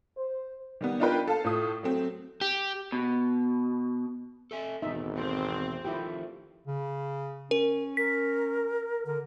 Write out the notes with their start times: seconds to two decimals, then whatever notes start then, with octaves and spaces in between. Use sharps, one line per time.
0.17 C5
0.81 D#3 G3 B3
1.00 D4 D#4 F4 A#4 B4 G5
1.28 A4 F5 A5
1.44 A2 A3 F4 D#6
1.83 F#3 A3 C4
2.41 G4
2.92 B2
4.51 A4 E5 G#5
4.82 G#1 E2 B2 A3 D#4 E5
5.16 C4
5.85 D#3 F3 A3 E4 G4
6.67 C#3
7.51 C#4 A#4
7.97 A#4 B6
9.06 D3 A#4